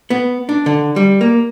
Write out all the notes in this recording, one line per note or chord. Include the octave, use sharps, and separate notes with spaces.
B3
D4
D3
G3
A#3